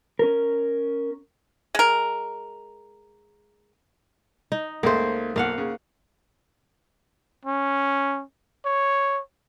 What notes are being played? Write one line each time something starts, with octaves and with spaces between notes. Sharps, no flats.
C#4 A#4
G#3 A#4
D#4
C#2 A3 A#3 C5
B1 A#3 F5 F#5
C#3
C#4
C#5